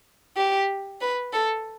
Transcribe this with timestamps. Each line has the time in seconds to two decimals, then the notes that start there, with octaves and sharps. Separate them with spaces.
0.37 G4
1.01 B4
1.33 A4